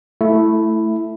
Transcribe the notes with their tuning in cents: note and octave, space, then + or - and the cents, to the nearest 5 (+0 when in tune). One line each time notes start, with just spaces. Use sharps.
A3 +0 E4 +0